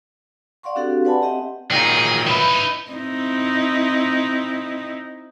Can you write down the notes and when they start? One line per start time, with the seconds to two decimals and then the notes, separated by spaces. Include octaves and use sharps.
0.63 D5 F5 F#5 C6 C#6
0.76 C4 D4 F#4 G4 A4 F5
1.05 B4 D5 F#5 G#5 A5 B5
1.22 C4 G4 D#5 E5 F#5 G5
1.71 A#2 D#3 F#3 D#4 G#4 G5
2.27 D#4 E4 B4 E5
2.91 C4 D#4 E4